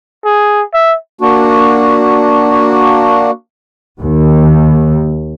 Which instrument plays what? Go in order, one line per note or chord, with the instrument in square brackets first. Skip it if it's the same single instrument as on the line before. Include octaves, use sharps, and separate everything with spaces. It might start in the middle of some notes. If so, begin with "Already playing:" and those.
[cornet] G#4
E5
[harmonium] A#3 D4 F#4
[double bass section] D#2